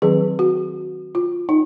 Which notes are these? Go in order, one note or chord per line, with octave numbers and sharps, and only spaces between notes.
D#3 F#3 C4 G#4
F#4
F4
D#4